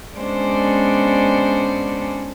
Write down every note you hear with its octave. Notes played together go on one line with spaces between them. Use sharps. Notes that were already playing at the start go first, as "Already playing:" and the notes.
G#3 B3 C#4 D4 C5 D5